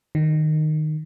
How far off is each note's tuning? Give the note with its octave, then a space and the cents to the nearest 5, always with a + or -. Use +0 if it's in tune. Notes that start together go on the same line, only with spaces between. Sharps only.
D#3 -15